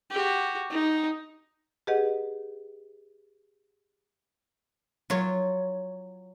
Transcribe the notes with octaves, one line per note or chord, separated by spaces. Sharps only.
F#4 G4
D#4
G4 G#4 B4 D#5 F#5
F#3 F4 C#5